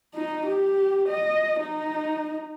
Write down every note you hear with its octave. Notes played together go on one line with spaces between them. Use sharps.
D#4
G4
D#5
D#4